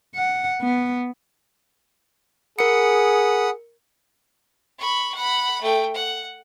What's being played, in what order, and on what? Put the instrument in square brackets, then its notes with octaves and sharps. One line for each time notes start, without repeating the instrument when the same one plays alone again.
[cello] F#5
B3
[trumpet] G#4 [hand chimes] A#4 C#7 [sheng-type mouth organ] F#5 B5 D#6
[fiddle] B5 C#6
F#5 B5
A3 G5
F#5